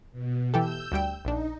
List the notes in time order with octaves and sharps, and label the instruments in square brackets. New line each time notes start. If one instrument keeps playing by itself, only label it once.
[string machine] B2
[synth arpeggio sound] E3 G4 A4 [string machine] E6 G6
[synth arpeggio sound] D2 G3 G5
[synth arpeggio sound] A#1 D4 [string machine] D#4